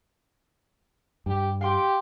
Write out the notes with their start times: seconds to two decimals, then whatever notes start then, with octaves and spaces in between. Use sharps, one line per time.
1.26 G2 G4
1.61 G4 F5 G5 C6